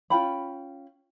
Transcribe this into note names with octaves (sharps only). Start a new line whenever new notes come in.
C#4 F4 G5 B5